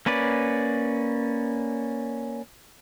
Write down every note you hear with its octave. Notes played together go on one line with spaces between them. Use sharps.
A#3 C#4 B4 D5